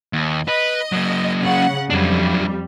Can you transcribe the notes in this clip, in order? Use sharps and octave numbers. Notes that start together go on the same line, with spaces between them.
D#2
B4 D#5
F#3 A#3
C#3 F#5
F2 F#3 G3 D4